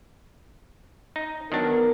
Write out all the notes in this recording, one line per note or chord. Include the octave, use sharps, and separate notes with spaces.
D#4
D#3 F#3 B3 D4 A#4